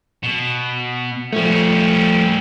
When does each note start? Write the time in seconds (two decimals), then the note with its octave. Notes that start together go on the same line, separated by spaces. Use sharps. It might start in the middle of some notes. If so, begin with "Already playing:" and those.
0.23 B2
1.33 F3 G3 A3 C#4